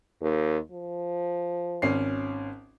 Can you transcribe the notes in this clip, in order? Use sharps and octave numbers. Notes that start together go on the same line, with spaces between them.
D#2
F3
G#1 C#4 C7